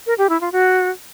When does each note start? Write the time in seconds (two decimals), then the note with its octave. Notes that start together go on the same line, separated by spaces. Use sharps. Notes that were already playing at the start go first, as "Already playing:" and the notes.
0.07 A#4
0.18 G4
0.29 E4
0.41 F4
0.52 F#4